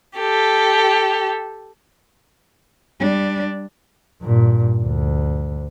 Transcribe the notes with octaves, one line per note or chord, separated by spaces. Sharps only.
G4 A4
G3 D4
G2 A#2
D2